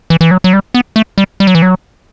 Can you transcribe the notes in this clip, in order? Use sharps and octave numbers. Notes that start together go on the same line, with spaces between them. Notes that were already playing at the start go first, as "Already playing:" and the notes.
E3
E3
F#3
F#3
G3
B3
A3
G3
G3
F#3
E3
F#3